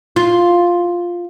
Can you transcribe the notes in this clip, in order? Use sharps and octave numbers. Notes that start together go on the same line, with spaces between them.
F4